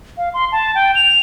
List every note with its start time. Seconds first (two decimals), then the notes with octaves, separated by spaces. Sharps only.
0.17 F5
0.34 C6
0.52 A5
0.75 G5
0.95 F7